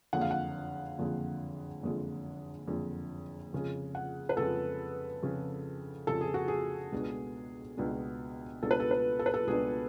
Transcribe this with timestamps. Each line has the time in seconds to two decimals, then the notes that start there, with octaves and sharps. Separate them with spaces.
0.13 F#1 F2 D3 G#3 F#5
0.21 F5
0.31 F#5
0.98 F#1 F2 D3 G#3
1.82 F#1 F2 D3 G#3
2.68 F#1 F2 D3 G#3
3.53 F2 C#3 G#3
3.95 F#5
4.29 B4
4.37 F2 C#3 G#3 A4
5.23 F2 C#3 G#3
6.07 F2 C#3 G#3 A4
6.21 G#4
6.34 F#4
6.48 G#4
6.92 C#2 B2 G#3 D4
7.77 C#2 B2 G#3 D4
8.63 C#2 B2 G#3 D4 A4
8.71 B4
8.80 A4
8.91 B4
9.19 A4
9.26 B4
9.34 A4
9.47 C#2 B2 G#3 D4 G#4